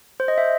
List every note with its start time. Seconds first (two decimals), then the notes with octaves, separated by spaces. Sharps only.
0.20 C5
0.28 D#5
0.38 E5